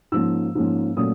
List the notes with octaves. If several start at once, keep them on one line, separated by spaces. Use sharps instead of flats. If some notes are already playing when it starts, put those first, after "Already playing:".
G#2 F3 A#3 C#4 E6
G#2 F3 A#3 C#4
A#2 F#3 A3 C#4 D#6